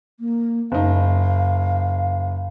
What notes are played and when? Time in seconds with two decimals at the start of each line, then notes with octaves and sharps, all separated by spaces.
0.20 A#3
0.72 F#1 D#4 F5